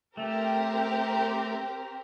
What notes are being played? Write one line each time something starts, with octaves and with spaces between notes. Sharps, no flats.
A3 C4 G4 A#4